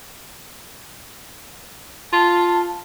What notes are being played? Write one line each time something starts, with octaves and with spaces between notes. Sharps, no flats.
F4 A5